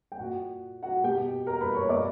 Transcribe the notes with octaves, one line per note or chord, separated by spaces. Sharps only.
G5
A#2 F#4 F#5
F#4 F#5
B2 G4 G5
A#4 A#5
B4 B5
C#5 C#6
B2 D5 D6